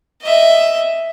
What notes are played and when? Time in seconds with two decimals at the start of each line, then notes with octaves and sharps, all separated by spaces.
0.22 D#5 E5